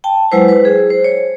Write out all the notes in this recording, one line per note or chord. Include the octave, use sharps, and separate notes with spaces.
G5 A5
F#3 G#3 E4 B4 C5
B4 C5
G#4
C5
C#5